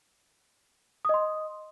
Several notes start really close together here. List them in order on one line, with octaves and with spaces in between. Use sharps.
D#6 D#5 C6